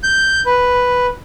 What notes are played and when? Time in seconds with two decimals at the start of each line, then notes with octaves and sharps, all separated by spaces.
0.03 G6
0.46 B4